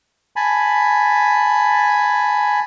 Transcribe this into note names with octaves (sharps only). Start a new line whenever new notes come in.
G#5 A5 B5